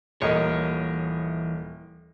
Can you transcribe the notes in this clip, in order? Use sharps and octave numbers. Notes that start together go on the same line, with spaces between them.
D#1 E3 A#4 C#5 D#5